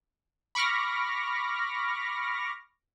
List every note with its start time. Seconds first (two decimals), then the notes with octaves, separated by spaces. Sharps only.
0.55 B5 C#6 D6 F6 A#6